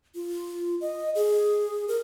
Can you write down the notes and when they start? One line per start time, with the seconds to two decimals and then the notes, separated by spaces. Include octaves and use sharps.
0.15 F4
0.81 D#5
1.15 G#4
1.88 A#4